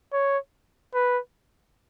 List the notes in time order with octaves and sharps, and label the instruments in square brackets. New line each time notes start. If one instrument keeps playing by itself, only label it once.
[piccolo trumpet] C#5
B4